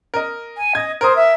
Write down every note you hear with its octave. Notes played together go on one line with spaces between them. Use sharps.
A#4 D#5
G#5
D#5 G#6
A#4 C5 D#6
E5